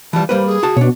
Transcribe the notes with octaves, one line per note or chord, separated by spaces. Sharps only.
E3 F3 G3 A5
G3 A#3 B4 C5
G#4
F#4 A5
B2 D4 C#5